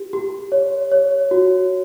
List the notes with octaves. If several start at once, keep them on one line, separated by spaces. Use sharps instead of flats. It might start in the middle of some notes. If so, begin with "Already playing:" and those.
Already playing: G4
G4
C#5
C#5
F#4